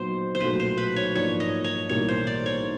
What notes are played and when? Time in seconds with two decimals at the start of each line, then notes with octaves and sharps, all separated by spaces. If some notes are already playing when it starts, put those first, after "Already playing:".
Already playing: A#2 F#3 B3 D#4 C5
0.35 C5
0.40 B1 A#2 F#3 A3 B4
0.60 C5
0.78 B4
0.96 C#5
1.15 G#2 F3 A#3 D4 C#5
1.40 D#5
1.64 C#5
1.89 B1 A2 E3 G3 A#3 C#5
2.08 C5
2.27 D5
2.46 C#5